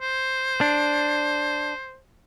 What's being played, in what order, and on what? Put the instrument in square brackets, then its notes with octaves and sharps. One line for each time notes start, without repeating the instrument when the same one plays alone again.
[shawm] C5
[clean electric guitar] D4